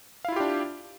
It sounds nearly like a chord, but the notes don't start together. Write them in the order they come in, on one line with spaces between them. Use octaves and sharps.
F5 E4 F4 G4 D4